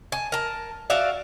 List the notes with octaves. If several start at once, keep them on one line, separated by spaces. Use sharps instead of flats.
G#5 A5
A#4 A5
F#4 D5 E5 F5